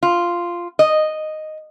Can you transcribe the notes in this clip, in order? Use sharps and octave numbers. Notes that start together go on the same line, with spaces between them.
F4
D#5